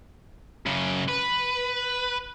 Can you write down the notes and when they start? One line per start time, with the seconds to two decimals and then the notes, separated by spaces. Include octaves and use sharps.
0.66 F#2 C#3
1.08 B4